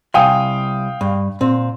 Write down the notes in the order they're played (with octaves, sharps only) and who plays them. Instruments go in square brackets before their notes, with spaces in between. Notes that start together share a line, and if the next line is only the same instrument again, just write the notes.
[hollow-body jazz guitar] C2 G#5 C6 [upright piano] F5 G5 D#6
[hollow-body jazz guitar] G2
A#2 C4